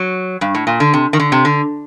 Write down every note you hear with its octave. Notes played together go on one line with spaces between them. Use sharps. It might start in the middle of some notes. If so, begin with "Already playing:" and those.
Already playing: F#3
G2
A2
A#2
D3
C3
D#3
D3
C3
D3